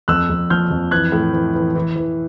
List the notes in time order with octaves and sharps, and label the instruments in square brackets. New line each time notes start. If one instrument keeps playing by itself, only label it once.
[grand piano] F2 E6 F#6
F2
F3 F6 G6
F2
E3 F#6 G#6
A2
E3
E3
E3
E3